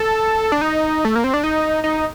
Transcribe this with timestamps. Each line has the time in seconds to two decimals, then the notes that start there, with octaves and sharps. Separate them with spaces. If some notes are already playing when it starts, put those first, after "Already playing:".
Already playing: A4
0.52 D4
0.61 D#4
1.05 A3
1.15 A#3
1.24 C4
1.34 D4
1.44 D#4
1.84 D#4